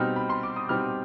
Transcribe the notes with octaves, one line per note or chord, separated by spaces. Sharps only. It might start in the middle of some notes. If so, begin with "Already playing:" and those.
Already playing: B2 G3 C4 D#4 F6
B5
C6
D6
D#6
B2 G3 C4 D#4 F6